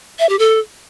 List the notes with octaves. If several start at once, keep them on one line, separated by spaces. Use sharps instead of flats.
E5
G4
A4